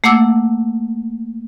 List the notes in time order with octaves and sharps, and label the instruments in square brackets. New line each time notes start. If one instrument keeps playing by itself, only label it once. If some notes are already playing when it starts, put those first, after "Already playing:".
[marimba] A3 A#3 F#5 D6 E6